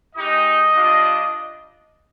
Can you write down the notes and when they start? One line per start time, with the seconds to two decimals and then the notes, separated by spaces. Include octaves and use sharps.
0.15 G#3 D#4 G4 D#5
0.73 G3 D4 F4